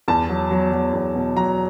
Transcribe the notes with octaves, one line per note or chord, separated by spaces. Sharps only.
E2 A5
F#3
F#3
F#3
E2
B2
F#3 A#5